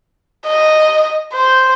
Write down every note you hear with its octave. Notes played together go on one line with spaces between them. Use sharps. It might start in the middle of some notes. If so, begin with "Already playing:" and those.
D#5
C5